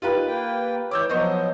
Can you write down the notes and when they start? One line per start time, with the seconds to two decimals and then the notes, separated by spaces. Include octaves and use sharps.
0.02 D#3 F4 G4 B4
0.26 A#3 G5
0.91 E3 C#5 D6 E6 G6
1.09 F3 F#3 B3 C5 D#5 C#6